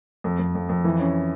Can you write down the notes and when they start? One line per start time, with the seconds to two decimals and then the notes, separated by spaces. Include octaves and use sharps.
0.24 F2
0.39 F2
0.55 F2
0.69 F2
0.84 E3
0.99 C#4